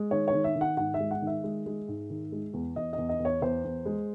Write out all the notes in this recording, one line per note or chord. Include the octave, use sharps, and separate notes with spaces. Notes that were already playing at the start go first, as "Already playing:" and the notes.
Already playing: G#3
D#3 C#5
C#5
D#3
E5
D#3
F#5
G#2 F#5
E5
G#3
F#5
D#3
E5
G#3
G#3
G#2
D#3
G#3
E2
E2 D#5
E2 D#5
D#5
E2
C#5
E2 C5
E2
G#3